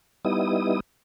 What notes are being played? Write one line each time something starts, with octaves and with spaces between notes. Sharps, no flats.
G3 B3 D#4 E4 D#6